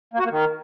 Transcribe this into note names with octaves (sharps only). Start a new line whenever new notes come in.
A#3
F#4
A#3
D#3